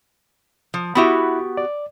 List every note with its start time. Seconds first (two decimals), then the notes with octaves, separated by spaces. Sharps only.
0.74 F3
0.95 B3 E4 F#4 G4 B5
1.57 D5